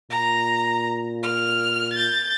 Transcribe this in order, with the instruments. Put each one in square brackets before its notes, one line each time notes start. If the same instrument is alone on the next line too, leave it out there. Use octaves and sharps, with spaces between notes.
[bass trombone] A#2 [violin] A#5
[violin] F6
G6 A6